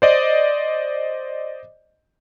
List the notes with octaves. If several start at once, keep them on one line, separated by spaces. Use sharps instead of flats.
C5 D5 D#5